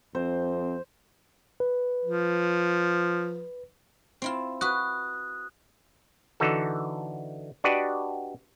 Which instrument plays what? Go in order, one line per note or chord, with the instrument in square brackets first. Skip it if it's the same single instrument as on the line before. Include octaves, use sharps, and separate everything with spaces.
[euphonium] F2 [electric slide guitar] C4 [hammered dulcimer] C5
[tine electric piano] B4
[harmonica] F3
[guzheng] C4 E4 F4
[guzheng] F#4 B4 [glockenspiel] D#6 F#6
[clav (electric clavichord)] D3 E3 D#4 F#4 A4
D4 F#4 G4 B4 D5 D#5